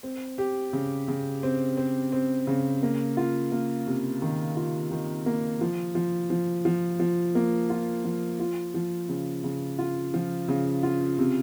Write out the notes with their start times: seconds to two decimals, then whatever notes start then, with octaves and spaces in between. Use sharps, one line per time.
0.03 C4
0.38 G4
0.73 C#3
1.08 C#3
1.43 C4
1.77 C4
2.12 C4
2.47 C#3
2.82 A#3
3.17 F4
3.51 A#3
3.87 C3
4.22 D#3
4.56 F4
4.91 D#3
5.26 A#3
5.61 F3
5.95 F3
6.30 F3
6.65 F3
7.00 F3
7.35 A#3
7.70 F4
8.04 F3
8.40 F4
8.74 F3
9.09 C#3
9.44 C#3
9.79 F4
10.14 F3
10.48 C#3
10.83 F4
11.18 C3